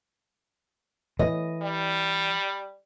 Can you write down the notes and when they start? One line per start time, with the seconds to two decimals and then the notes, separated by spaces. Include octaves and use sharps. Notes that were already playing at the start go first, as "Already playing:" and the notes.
1.19 E3 D#5
1.62 G3